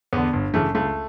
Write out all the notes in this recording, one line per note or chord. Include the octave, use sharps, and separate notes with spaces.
E2 D3 B3
G1
F#2 C#3 E3 A3
C#2 A3